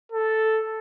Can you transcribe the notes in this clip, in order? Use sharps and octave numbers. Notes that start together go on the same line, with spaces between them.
A4